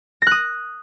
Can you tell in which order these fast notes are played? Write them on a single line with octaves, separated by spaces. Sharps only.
A#6 F#6 D#6